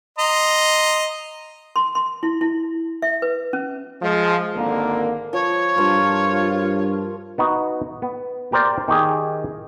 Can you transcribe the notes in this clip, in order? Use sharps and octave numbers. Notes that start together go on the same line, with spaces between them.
D#5 A#5 C6
C6
C6
E4
E4
E5
B4
C#4
F3 G#3
G#1 D3 A#3
F3 C#5
G2 F4 A#4 C5 A5
B3 D#4 F#4
B3
G4 A#4 C5 D5
D#3 D#4 G4 G#4